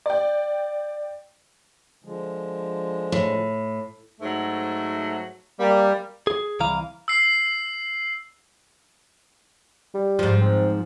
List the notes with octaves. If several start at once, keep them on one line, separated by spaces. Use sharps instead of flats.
D5 G5
D3 F3 G#3
A2
G#2 F#3 A3
G3 A#3
G#4
C2 E3 F5 A#5
E6 C7
G3
G#2 F3
C4